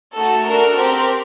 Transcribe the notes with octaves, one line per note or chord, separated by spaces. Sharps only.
A3 D#4 F#4 A4
D4 F#4 A4 A#4
C4 G4